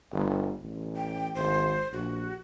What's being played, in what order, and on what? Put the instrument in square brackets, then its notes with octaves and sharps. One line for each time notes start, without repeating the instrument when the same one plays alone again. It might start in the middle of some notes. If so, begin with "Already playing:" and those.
[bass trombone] G1
A1
[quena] G5
[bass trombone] G#1 [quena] C5
[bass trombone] A#1 [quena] F#4